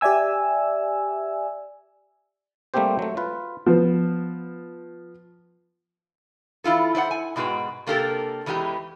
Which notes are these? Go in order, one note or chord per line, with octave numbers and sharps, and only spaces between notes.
G4 D5 E5 G#5 E6
G3 A3 A#3 C4 G4 C5
F#3 A3
F4 B4
F3 B3
E3 E4 F4 A4
E4 C5 D5 F#5
G#5
G#2 B2 G#3 F#4 B4 G5
C3 A#3 D4 G4 A4 A#4
E2 E3 G#3 D4 G4 A#5